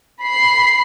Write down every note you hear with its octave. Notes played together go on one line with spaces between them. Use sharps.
B5 C7